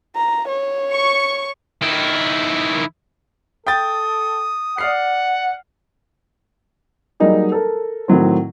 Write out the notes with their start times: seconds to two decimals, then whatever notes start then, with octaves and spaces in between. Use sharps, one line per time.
0.16 A#5
0.48 C#5
0.93 C#6
1.81 D#3 E4
3.67 A4 G5 D#6 G6 A6
4.78 D5 F#5 F6 C7
7.20 F#3 G3 A#3 D#4 G#4
7.52 A4 A#4
8.08 A2 D#3 F#3 C4